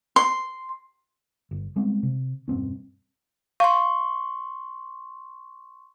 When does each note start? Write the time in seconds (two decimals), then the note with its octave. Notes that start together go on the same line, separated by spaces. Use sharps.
0.16 C6
1.51 G1
1.76 G3 G#3 B3 C4
2.03 C3
2.48 E1 G2 C4 C#4
3.60 F5 C6 C#6